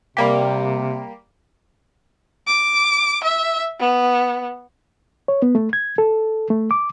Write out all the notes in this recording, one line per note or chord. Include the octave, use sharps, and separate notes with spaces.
C3 G3 A#3 G4
D6
E5
B3
C#5
B3
A3
G#6
A4
A3
D6